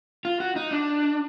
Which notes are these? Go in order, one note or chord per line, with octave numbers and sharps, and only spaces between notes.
F4
F#4
D#4
D4